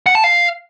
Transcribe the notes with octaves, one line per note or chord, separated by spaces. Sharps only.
F#5
A5
F5